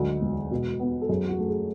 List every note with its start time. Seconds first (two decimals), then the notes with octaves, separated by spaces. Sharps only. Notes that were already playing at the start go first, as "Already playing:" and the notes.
Already playing: D2 G#2 F#3
0.22 E1
0.51 B2
0.80 B3
1.02 A4
1.09 F#2 G#4
1.28 F#4
1.38 A3
1.48 G#4